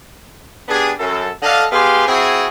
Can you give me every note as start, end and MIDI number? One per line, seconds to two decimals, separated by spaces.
0.68 0.91 59
0.68 0.91 62
0.68 0.91 67
0.68 0.91 68
0.99 1.29 42
0.99 1.29 69
1.42 1.64 50
1.42 1.64 62
1.42 1.64 69
1.42 1.64 75
1.42 1.64 77
1.72 2.04 59
1.72 2.04 67
1.72 2.04 68
1.72 2.04 77
1.72 2.04 84
2.07 2.47 60
2.07 2.47 64
2.07 2.47 66
2.07 2.47 68